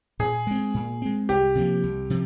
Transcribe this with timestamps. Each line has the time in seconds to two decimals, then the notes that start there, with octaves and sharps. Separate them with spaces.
0.19 A#2 G#4
0.47 G#3 C4
0.74 A#2
1.02 G#3 C4
1.29 C2 G4
1.55 C3 F3 A#3
1.83 C2
2.10 C3 F3